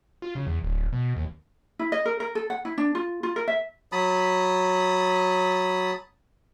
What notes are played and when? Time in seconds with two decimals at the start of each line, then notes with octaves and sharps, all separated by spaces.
0.22 F4
0.35 C#3
0.47 E2
0.64 D1
0.93 B2
1.16 D#2
1.79 E4
1.92 D#5
2.06 A#4
2.20 A#4
2.35 A4
2.50 F#5
2.65 E4
2.78 D4
2.95 F4
3.23 F4
3.36 A#4
3.48 E5
3.92 F#3 A5 B5 D#6